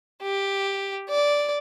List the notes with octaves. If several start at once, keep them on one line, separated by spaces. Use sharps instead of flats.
G4
D5